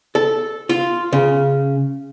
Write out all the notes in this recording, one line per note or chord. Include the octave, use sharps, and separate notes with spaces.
A4
F4
C#3